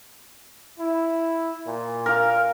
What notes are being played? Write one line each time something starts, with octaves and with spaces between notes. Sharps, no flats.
E4
A#2
A#4 F5